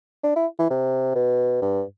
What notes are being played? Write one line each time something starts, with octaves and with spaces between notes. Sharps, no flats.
D4
E4
E3
C3
B2
G2